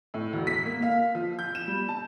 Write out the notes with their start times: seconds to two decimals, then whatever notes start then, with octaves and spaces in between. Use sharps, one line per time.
0.14 A2
0.33 E1
0.47 B6
0.65 A#3
0.82 F5
1.15 F3
1.39 G6
1.55 E7
1.67 G3
1.89 A5